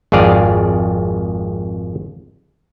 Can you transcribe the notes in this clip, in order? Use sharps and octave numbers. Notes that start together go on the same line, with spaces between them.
G#1 F2 G#4 D5 F5